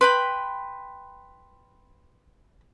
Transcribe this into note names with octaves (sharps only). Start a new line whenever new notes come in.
B4 G5 B5 C6